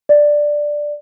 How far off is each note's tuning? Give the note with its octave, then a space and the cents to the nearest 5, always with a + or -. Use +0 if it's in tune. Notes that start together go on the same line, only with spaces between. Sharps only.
D5 +5